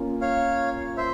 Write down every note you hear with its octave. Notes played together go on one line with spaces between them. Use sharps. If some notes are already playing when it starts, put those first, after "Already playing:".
Already playing: A#3 C#4 F4
C#5 F5
C5 E5